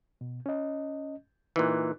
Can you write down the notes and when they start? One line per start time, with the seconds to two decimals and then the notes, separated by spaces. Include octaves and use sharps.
0.21 B2
0.46 C#4 D#5
1.56 A#2 E3 D#4 F#6